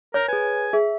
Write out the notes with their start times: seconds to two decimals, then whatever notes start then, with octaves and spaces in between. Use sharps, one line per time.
0.14 A#4 C#5
0.28 G#4 B4 G#5
0.73 G#4 E5